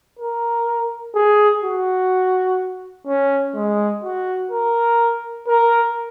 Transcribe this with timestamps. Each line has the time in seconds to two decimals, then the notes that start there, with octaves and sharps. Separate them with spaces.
0.19 A#4
1.15 G#4
1.64 F#4
3.07 C#4
3.55 G#3
4.03 F#4
4.52 A#4
5.48 A#4